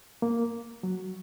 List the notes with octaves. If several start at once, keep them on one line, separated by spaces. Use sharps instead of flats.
A#3
F#3